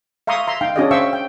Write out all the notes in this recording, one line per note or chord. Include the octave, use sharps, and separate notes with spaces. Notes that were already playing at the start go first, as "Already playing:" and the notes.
E5 F5 A#5 C6 C#6 D#6
E5 A#5 C6
D#4 F5 G5
C#4 D4 F#4 G#4 D5 D#5
C5 E5 F5 G5 C#6 E6
G5